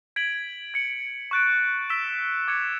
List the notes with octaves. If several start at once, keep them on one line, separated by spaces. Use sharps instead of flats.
G#6 B6 D7 F#7
G#6 C#7 F#7
C#6 F#6 A6 D7
E6 B6 E7
D6 G#6 C#7 E7